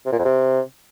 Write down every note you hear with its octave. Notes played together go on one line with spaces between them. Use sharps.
C3
A#2
F2
C3